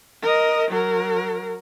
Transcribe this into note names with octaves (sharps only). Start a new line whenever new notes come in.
A#4 D#5
F#3 A#4